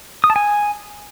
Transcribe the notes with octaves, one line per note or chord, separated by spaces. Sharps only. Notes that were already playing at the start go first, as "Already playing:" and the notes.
D#6
A5
G#5